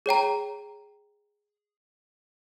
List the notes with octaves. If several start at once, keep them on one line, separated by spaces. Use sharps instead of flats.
G#4 C#5 G5 A#5